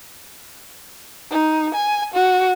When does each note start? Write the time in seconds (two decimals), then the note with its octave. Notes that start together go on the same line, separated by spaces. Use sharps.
1.31 D#4
1.74 G#5
2.14 F#4